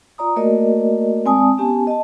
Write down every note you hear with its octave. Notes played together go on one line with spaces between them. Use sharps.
F4 D5 A#5 D#6
A3 A#3 F#4 A#4 D5 D#5
G#3 C4 D5 G#5 A5 D#6
B3 C#4 G4 G#5 A5
D#5 A5